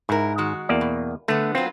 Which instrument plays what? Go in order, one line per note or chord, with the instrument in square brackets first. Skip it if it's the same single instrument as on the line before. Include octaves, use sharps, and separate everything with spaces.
[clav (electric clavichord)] G#2 [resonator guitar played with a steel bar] E4 A#4
[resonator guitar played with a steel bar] D#3 G#3 F#4
[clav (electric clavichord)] E2 A#3 D5
[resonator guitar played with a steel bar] B2
[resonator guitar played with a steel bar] D3 B3 [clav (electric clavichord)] A3
[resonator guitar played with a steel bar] F#3 B3 F4 [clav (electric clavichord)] C4